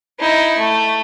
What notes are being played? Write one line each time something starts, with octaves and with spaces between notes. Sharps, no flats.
D#4 E4
A3